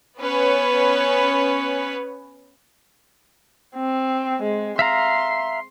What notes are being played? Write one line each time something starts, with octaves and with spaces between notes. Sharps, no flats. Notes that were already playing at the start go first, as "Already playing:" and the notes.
B3 C#4 B4 C#5
C4
G#3
E5 F5 A#5 C6